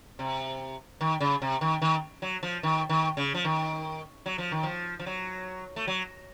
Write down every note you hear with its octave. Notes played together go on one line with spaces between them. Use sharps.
C3
D#3
C#3
C3
D#3
D#3
F#3
F3
D#3
D#3
C#3
F3
D#3
F#3
F3
D#3
F3
F3
F#3
A3
F#3